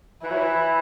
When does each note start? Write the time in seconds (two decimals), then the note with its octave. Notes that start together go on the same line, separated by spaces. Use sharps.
0.23 E3 E4
0.31 F#3
0.37 E3